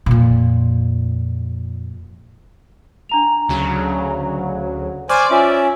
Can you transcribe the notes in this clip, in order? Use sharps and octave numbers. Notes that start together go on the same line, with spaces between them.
F2 A#2
D4 A#5 F7
D2 C#3 F#3
C5 D5 G#5 C#6 D6 F6
C#4 F4 E5 G#5